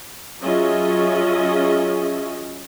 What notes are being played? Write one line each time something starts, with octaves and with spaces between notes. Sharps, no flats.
F#3 C#4 F4 G#4 D#5 E5